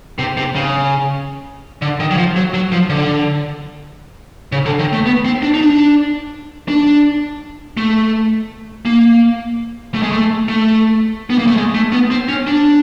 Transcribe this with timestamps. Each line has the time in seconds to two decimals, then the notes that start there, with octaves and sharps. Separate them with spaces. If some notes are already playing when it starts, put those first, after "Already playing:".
0.19 C3
0.37 C3
0.55 C#3
1.82 D3
2.00 D#3
2.11 F#3
2.17 F3
2.36 F#3
2.54 F#3
2.72 F3
2.90 D3
4.52 C#3
4.66 D3
4.79 D#3
4.93 A3
5.06 B3
5.25 C4
5.43 D4
5.54 D#4
5.61 D4
6.69 D4
7.77 A3
8.85 A#3
9.94 A3
10.02 G#3
10.12 A3
10.49 A3
11.30 B3
11.39 A#3
11.47 A3
11.57 G#3
11.75 A3
11.92 B3
12.11 C4
12.29 C#4
12.47 D4